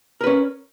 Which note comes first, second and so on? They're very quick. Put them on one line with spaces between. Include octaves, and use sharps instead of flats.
A#4 B4 C#4